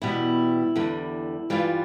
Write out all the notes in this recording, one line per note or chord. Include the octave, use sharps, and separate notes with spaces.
E2 B2 G3 E4
E2 D3 G3
G2 E3 G3 F4